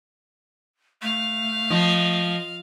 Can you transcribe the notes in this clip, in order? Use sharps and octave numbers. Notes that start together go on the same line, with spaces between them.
A3 F5
F3 D#5